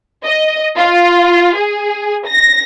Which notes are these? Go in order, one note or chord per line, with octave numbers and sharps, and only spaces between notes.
D#5
F4
G#4
A#6